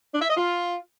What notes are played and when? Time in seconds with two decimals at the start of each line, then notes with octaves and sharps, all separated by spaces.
0.12 D4
0.20 E5
0.28 D#5
0.36 F4